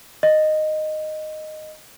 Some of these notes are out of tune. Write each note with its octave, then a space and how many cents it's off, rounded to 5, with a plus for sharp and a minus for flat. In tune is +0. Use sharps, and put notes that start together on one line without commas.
D#5 -10